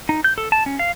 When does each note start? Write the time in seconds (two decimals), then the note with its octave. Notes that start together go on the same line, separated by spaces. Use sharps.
0.09 D#4
0.24 G6
0.38 A4
0.52 A5
0.66 C#4
0.79 F5